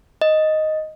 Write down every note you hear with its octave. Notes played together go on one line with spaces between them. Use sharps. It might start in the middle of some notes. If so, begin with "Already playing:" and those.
D#5